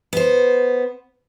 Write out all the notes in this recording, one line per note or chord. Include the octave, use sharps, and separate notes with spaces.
B3 C5